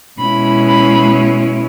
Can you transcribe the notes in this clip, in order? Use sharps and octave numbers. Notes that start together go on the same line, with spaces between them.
B2 G#3 C#4 E4 B5
B5